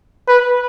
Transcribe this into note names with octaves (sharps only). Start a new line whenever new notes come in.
B4